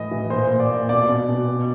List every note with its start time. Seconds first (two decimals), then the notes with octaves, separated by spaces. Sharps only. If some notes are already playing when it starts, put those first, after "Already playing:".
Already playing: A2 E3 D#5
0.11 E3
0.30 A#2 C5
0.51 A#2
0.60 D5
0.69 A#2
0.89 B2 D5
1.09 B2
1.29 B2
1.48 B2